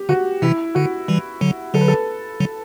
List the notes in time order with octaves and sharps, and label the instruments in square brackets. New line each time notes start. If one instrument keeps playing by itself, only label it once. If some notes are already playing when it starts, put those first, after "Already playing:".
Already playing: [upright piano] G4
[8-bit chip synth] D3 [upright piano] F#4
[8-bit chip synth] C3 E3 [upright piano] E4
[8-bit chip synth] D3 [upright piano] F#4
[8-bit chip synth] E3 G3
D3 F#3
[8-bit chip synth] D3 F#3 [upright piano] A4
[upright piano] B4
A4
[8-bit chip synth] D3 F#3